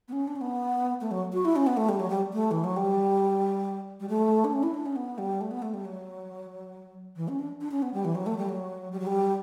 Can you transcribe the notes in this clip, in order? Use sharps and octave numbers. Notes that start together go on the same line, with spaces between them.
B3
C#4
D4
C#4
B3
A3
F#3
F#4
E4
C#4
B3
A3
G3
F#3
G3
A3
E3
F#3
G3
G3
A3
D4
C#4
E4
D4
C#4
B3
G3
A3
B3
A3
G3
F#3
E3
C#4
D4
D4
C#4
B3
G3
E3
F#3
A3
G3
F#3
G3
F#3
G3